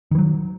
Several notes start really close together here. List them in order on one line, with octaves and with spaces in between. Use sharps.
D#3 E3 F#3